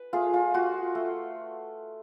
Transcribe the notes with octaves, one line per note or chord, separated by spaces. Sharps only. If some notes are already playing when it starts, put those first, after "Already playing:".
Already playing: B4
A3 F4 G#4
F4
F4 F#4
A3